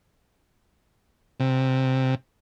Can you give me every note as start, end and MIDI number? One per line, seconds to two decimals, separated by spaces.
1.40 2.15 48